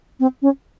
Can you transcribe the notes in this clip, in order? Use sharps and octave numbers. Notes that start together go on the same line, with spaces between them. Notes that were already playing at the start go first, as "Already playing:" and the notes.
C4
C#4